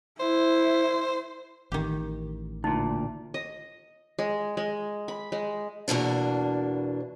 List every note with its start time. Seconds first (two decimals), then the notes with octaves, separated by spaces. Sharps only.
0.20 E4 C5
1.72 A1 D#3 G4
2.64 D2 A#2 D#4
3.34 D#5
4.19 G#3
4.57 G#3
5.08 B5
5.32 G#3
5.88 E2 B2 A#3 D4